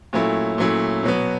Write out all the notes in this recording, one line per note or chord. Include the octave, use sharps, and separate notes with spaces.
A#2 F#3 A3 C#4 E4
A#2 F#3 A3 C#4 E4
B2 F#3 B3